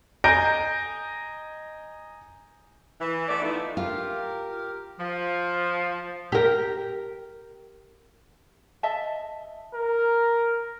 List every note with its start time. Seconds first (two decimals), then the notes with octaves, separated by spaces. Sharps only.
0.24 D#5 G#5 A#5 G6 A#6 D7
3.00 E3
3.29 A3 B3 D5
3.42 F3 A3 B3 D#4 E4
3.77 F4 G4 A#4
4.99 F3
6.32 G4 A#4
8.83 D#5 E5 A5
9.74 A#4